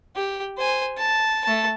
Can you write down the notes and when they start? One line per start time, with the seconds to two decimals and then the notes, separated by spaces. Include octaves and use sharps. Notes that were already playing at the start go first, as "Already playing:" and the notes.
0.16 G4
0.58 C5 G#5
0.98 A5
1.44 A3 A5